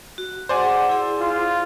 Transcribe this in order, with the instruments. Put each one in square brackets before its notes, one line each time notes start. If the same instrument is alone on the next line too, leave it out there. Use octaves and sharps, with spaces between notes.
[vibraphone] F#4
[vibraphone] G#4 F#5 D6 [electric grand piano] C5 D5 G#5
[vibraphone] E4 G#4
[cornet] F4